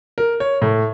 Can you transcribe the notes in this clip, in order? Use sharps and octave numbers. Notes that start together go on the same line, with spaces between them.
A#4
C#5
A2